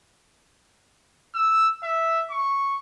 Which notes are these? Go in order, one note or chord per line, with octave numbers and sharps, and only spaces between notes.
E6
E5
C#6